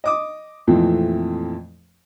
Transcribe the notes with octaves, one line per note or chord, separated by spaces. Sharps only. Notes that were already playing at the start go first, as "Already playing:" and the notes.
D#5 D6 D#6
F2 A#2 E3 F3 A3 C4